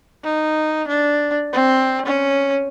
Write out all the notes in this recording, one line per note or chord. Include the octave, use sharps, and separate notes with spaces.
D#4
D4
C4
C#4